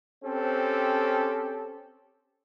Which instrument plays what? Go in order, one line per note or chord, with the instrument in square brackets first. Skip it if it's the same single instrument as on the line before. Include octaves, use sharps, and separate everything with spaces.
[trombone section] C4 C#4 G4 A4